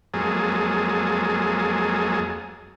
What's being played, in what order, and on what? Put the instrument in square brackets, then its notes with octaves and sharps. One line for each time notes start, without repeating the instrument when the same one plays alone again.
[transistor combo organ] F2 F#3 G#3 A#3 G#4 A4